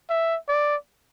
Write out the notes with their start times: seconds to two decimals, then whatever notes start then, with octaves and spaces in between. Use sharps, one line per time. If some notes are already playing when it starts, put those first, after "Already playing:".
0.10 E5
0.48 D5